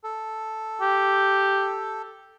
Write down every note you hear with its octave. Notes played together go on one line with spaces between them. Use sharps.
A4
G4